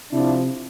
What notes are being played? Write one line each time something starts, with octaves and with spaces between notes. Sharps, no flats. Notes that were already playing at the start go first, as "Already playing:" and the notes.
C3 F3 D4 E4